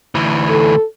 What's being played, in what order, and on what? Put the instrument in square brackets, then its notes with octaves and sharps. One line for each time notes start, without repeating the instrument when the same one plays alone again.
[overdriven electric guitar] D2 E3
[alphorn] A4